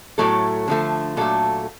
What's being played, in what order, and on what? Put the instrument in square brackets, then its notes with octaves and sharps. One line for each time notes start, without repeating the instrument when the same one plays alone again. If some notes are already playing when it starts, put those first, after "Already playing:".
[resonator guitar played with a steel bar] A2 F#3 A3 A4
D3 F3 A3
A#2 F#3 A3 A4